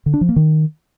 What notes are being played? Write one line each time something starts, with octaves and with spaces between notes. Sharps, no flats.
D3
D4
F3
A#3
D#3